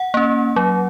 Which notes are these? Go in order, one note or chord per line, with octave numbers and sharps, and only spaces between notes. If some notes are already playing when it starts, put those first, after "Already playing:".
Already playing: F#5
A#3 C#4
F#3